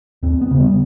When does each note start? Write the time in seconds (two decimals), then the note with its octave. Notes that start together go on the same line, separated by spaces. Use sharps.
0.23 D#2 C4
0.41 B3
0.51 C#3
0.60 G3